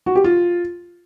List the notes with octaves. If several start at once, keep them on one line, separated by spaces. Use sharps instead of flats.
F#4
G4
F4